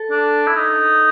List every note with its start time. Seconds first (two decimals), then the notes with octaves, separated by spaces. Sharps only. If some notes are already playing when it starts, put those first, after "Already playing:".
Already playing: A4
0.11 D4
0.48 E4
0.56 D#4